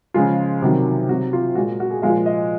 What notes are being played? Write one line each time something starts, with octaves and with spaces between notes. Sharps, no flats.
C#3 F3 G#3 F4
C3 D#3 F#3
C3 F#3 F#4
F4
A#2 G#3 F#4
F#4
G#4
A#2 F3 G#3 F5
D#5